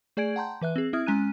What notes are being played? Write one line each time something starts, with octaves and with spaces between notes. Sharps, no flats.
A3 G#4 D5 G#5 G#6 D7
F#5 G5 A5 A#5 C6 G6
E3 B4 E5 F#6
C4 G#4
C4 E4 E5 D#6 F6 G#6
G#3 C#4 G#5 A#5 F#6 D#7